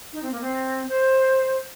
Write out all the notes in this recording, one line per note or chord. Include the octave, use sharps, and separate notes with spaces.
D#4
C4
A#3
C4
C5